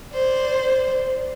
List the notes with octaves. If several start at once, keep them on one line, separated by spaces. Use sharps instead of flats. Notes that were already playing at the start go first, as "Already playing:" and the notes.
C5 D5